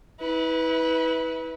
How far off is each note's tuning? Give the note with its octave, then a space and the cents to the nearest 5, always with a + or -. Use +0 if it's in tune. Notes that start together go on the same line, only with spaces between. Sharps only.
E4 -35 B4 +0